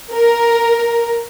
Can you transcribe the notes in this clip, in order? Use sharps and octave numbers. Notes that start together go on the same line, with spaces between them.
A#4